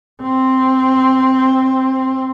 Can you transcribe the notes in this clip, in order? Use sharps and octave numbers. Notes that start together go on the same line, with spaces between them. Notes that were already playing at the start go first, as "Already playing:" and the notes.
C4